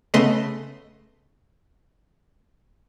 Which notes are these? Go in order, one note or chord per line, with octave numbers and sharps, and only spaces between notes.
C#3 A3 B3 D#5 C6